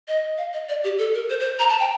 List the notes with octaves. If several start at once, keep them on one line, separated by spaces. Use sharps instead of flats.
D#5
F5
D#5
D5
G4
A4
A#4
C5
C5
A#5
A5
G5